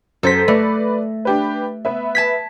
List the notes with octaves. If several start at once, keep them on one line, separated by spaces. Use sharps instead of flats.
F#2 A4 C5 A#6 B6
A3 B4 D5
D4 G4 B4
B3 B4 E5
A5 G#6 B6